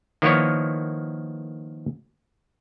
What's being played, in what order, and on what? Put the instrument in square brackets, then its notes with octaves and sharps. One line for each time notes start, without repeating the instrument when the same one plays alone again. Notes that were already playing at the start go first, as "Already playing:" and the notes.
[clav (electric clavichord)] D#3 F3 A#3 B3 E4 C#5